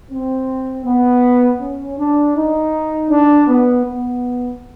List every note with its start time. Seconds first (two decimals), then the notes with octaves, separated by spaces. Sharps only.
0.10 C4
0.84 B3
1.60 C#4
1.97 D4
2.35 D#4
3.09 D4
3.47 B3
3.85 B3